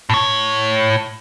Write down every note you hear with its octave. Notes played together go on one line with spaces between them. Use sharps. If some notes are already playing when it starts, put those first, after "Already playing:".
A2 C#5